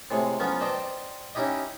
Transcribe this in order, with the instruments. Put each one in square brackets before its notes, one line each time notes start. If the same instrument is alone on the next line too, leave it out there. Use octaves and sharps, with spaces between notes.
[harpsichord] A2 C3 G#3
F3 F#3 B3 C#4
C5 D5 D#5 G5 A5
C#4 D#4 E4 G4 D#5